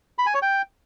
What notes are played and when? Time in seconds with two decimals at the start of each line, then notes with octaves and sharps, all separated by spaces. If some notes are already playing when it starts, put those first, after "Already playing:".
0.18 B5
0.26 G#5
0.34 C#5
0.42 G5